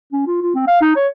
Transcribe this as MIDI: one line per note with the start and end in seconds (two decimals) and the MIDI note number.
0.13 0.22 61
0.27 0.41 65
0.42 0.53 65
0.56 0.65 60
0.68 0.78 77
0.82 0.91 63
0.96 1.08 73